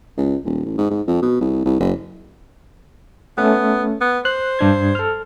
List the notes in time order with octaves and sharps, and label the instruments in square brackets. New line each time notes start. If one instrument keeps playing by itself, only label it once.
[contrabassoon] C#2
D#1
A1
G#2
G#2
F2
B2
C2
C2
F#1
[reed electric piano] A3 C#4 [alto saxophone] B3
[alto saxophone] B3
[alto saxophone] C5 [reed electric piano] F#6
[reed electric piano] G2 D4 G#6
A4 F6